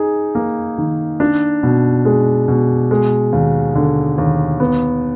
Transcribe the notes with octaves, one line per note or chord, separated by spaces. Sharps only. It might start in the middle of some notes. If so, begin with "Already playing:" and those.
Already playing: D#4 G#4
A#3
D#3
D4
B2
G#3
B2
G#3
D#2
D3
D#2
B3